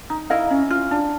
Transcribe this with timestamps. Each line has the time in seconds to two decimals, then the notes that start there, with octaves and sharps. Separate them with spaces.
0.10 D#4
0.30 E4 D#5 F5
0.50 C#4
0.71 F4
0.91 D4